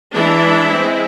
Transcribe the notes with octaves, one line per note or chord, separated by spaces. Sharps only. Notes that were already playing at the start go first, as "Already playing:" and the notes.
E3 G#3 D4 E4 E5
G#3 C4